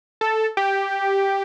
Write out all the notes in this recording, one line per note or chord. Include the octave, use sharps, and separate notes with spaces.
A4
G4